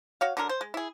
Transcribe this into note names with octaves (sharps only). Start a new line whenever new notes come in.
F#4 C#5 F5
D3 F#3 D4 A#4
C5
G#3
E4 G#4